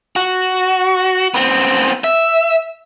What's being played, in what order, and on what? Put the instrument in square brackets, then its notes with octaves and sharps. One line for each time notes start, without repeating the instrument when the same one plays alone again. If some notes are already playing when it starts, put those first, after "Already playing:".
[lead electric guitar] F#4
B3 C4
E5